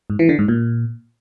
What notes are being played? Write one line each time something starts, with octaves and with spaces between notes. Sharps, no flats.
G#2
E3
D3
G#2
A#2